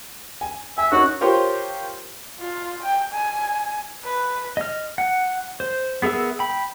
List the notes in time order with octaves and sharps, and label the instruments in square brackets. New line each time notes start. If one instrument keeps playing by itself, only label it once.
[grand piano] G#5
[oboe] E5 [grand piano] G#5
[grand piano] C#4 D#4 A#4 [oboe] F#4
[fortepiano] F4 G4 A#4 C5 C#5
[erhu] F4
G5
G#5
B4
[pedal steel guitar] D#5 F6
F#5
C5
B3 G#4 A#4 E5 E6
G5 B5